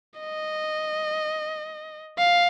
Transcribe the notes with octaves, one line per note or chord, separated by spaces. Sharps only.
D#5
F5